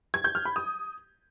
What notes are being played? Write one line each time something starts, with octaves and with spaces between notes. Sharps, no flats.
G#6
G6
F6
B5
D#6